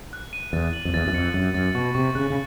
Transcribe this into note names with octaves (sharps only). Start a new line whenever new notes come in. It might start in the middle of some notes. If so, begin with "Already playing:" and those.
F#6
D#7
E2 A6
F#7
F2
E2 A6
F#2
F2 C#7
F#2 A6
F#2 A6
B2 C#6
C3 C#6
C#3 F#6
C#3